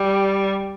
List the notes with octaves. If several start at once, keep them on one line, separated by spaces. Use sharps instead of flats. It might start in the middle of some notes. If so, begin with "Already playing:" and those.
Already playing: G3